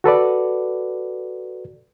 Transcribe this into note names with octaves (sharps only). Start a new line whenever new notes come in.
F#4 A4 B4 D5